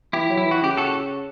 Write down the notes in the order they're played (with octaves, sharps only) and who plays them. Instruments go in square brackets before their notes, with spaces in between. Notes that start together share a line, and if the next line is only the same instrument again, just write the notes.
[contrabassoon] E3 [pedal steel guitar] E4 G4
[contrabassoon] F#3
[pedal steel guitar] E4
[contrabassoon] E3
[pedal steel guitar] F#4
[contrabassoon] C#3 [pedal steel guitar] G4
[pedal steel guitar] F#4 A4